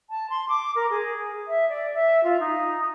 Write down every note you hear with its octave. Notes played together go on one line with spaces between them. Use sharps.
A5
C6
D6
A#4
G#4
E5
D5
E5
F4
D#4